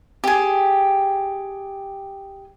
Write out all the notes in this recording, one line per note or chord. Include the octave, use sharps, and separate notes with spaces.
G4 G#4